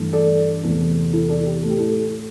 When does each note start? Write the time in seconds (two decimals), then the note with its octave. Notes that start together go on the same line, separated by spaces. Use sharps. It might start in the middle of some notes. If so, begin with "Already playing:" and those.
Already playing: G2 E3 A3
0.13 A4 D5
0.63 E2 C3 E3 A3
1.13 E4 A4
1.29 A4 D5
1.46 G4
1.63 A2 A3 A4
1.70 G4
1.79 E4 A4